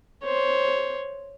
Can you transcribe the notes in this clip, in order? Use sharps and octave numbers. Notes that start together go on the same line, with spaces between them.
C5 C#5